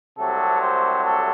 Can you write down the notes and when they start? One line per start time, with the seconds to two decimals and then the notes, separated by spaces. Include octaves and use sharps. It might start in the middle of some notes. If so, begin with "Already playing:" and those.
0.18 C2 C3 F#3 A3 A4
0.61 C5
1.04 A4